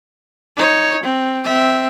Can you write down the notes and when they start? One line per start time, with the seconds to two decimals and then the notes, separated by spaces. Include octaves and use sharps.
0.56 D#4 C#5
1.03 C4
1.45 C4 E5